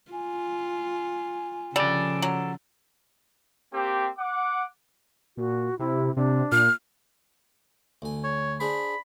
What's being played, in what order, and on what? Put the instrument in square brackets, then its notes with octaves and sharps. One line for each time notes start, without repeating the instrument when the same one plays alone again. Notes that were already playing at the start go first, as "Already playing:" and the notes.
[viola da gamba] F4 [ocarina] G#5
[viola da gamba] C#3 F3 [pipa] G3 [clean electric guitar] A4 D5
[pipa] F#3
[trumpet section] A#3 C4 G4
F#5 D6
[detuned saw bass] A#2 [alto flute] F#4
[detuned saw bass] C3 [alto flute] E4
[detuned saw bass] C3 [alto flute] D4
[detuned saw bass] A#2 [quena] F6
[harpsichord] D2 G#5
[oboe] C#5
[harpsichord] D4 G#4 C5 [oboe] B5